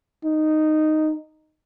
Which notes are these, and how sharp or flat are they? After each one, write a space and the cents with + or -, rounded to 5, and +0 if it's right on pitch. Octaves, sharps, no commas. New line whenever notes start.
D#4 -5